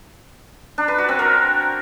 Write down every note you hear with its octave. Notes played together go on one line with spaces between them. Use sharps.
D4
B4
F#4
C4
A#4